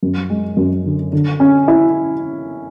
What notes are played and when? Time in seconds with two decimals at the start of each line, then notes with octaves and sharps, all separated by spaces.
0.03 F#2
0.30 G#3
0.57 F#2
0.85 D3
1.13 D3
1.40 C#4
1.68 E4